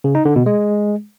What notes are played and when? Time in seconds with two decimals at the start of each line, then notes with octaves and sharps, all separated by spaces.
0.04 C#3
0.15 D#4
0.25 D3
0.36 B2
0.46 G#3